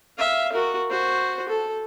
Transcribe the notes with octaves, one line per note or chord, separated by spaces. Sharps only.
E5 F5
F#4 A#4
F#4 C5
A4